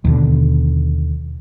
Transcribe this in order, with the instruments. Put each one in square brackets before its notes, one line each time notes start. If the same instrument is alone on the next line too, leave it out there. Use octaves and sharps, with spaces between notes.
[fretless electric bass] D#2 B2 D3